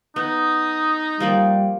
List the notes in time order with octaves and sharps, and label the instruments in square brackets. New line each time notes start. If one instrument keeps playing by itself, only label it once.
[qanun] B3 [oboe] D#4 [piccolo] D#6
[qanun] F3 A#3 D5 [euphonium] G3